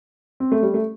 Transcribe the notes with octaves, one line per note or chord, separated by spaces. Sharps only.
C4
A3
G3
A3